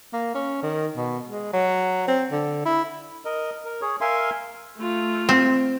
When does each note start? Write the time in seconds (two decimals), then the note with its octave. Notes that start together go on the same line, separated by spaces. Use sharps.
0.13 A#3
0.35 C#4
0.63 D#3
0.96 B2
1.28 G#3
1.53 F#3
2.08 C4
2.31 D3
2.65 E4
3.25 A#4 D#5
3.65 A#4
3.81 G#4 C#5
4.01 A#4 E5 F5 G#5 C6
4.78 A3 F4
5.29 C4